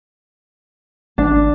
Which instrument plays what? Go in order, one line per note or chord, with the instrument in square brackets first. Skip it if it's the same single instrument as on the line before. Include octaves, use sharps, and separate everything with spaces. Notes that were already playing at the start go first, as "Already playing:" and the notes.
[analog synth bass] G#1 [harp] D4